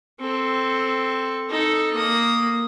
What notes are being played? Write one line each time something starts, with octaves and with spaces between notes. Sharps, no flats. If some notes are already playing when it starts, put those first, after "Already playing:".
C4 A4
D#4 A4
A#3 D#6